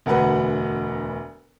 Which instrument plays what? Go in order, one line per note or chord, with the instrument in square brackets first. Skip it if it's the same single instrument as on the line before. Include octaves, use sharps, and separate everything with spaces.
[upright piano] E1 D2 F#4 A#4 B4 F#5